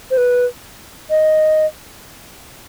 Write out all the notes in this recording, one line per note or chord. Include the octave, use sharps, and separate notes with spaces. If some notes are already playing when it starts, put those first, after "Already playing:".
C5
B4
D#5